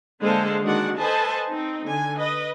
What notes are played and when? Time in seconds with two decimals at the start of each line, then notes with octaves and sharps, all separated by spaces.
0.21 D3 G#3 A#3 A4 C5 F5
0.62 D#3 G#3 D4 F#4 D5 F#5
0.98 A4 B4 C5 D#5 G#5 A5
1.49 C4 D#4
1.87 D3 G#5
2.18 B4 D#5